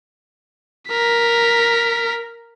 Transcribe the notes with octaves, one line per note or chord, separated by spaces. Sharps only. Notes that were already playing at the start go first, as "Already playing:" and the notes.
A#4 B6